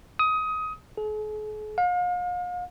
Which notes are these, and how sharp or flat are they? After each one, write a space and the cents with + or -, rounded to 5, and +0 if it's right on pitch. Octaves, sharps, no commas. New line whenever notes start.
D#6 +20
G#4 +45
F5 +40